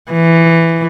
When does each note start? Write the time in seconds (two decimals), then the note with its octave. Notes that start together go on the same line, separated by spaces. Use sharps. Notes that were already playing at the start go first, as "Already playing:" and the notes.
0.12 E3